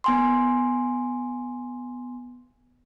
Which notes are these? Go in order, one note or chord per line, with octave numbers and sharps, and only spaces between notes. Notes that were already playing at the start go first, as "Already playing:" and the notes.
B3 G#5 C6